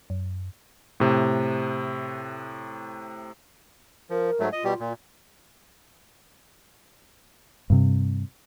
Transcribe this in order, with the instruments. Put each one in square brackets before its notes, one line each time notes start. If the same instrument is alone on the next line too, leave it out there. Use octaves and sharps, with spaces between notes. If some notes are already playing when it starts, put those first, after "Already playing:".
[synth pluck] F#2
[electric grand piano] A2 C3
[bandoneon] F3 [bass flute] A#4
[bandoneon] G#2 F#3 A3
[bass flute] F4 [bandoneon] D#5
[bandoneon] B2 G3 G4
A#2
[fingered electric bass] G2 C3